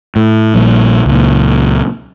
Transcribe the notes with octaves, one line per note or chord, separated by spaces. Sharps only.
A2
A#1 A#2 G3
C#2 A#2